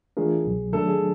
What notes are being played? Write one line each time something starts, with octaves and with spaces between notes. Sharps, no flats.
E3 A3 D4 F4 G#4 A#4
C2 B2 F#3
D#3 F#3 A3 D4 A4
G#4